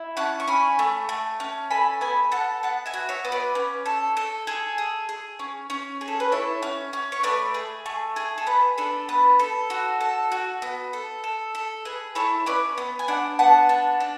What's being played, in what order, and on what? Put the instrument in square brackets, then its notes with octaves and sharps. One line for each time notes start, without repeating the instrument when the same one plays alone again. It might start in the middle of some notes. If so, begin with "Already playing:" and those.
Already playing: [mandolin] E4
C#4 F#5 A5
C#6
C#4 G#5 B5
A3
A3
C#4
A4 G#5 B5
B3 G#5 B5
A4 F#5 A5
B3 F#5 A5
E5 G#5
F#4
C#5 E5
B3
B4 D5
C#4
A4
A4
G#4 A4
G#4
G#4
C#4
C#4
G#4
A4
B4
E4 A4 C#5
C#4
C#4
C#5
A3 B4 D5
G#4
A3
G#4
A4
B3 B4
D4 A4
B3 B4
A4
F#4
A4
F#4
B3
A4
A4
A4
G#4 B4
E4 A4 C#5
C#4 B4 D5
B3
G#5
D4 D5 F#5
B3 F#5 A5
D4
D4